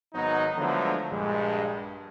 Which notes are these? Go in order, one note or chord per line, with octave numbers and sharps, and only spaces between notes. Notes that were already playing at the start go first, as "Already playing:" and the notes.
G#1 F#3 B3 D#4
D3 F3 F#3 G#3 A3 B3
A#1 G2 G#3